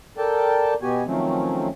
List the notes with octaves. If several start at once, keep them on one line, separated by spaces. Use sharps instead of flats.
A4 A#4 D5 G5 A5
B2 B3 F#4 G4 G#5
D#3 F3 F#3 A3 C4 C#4